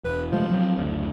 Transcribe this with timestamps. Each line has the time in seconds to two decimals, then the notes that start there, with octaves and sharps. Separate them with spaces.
0.04 E1 B4
0.32 C3 F3 G#3 A3
0.51 F#3 G#3 C4
0.77 F#1 D2 D3